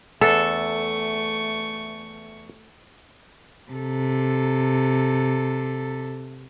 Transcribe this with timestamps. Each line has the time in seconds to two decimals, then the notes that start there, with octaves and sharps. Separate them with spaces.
0.21 E2 A3 D4 A4 C#6
3.72 C3 A4